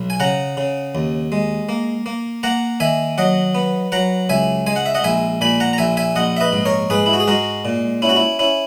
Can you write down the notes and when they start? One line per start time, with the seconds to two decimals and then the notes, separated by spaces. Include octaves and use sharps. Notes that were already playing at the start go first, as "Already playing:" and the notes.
Already playing: B1
0.10 G#5
0.20 C#3 F#5 A#5
0.57 C#3
0.95 D#2
1.32 G#3
1.69 A#3
2.06 A#3
2.43 A#3 F#5 A#5
2.80 D#3 E5 G#5
3.18 F#3 D#5 F#5
3.55 B3
3.92 F#3 F#5 A#5
4.29 C#2 E5 G#5
4.67 G#3 G#5
4.76 F#5
4.86 E5
4.95 D#5 F#5
5.04 A#1 E5 G#5
5.41 A#2 G#5 B5
5.60 F#5 A#5
5.73 A#5
5.78 A#1 E5 G#5
5.97 E5 G#5
6.16 A#1 D#5 F#5
6.37 E5
6.40 B4 D#5
6.53 G#2
6.65 A#4 C#5
6.90 G#2 G#4 B4
7.06 E4
7.13 F#4
7.20 G#4
7.28 G#3 F#4 A#4
7.65 A#2
8.02 C#4 E4
8.09 F#4
8.16 E4
8.39 C#4 E4